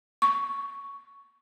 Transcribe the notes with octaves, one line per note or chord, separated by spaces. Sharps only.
C#6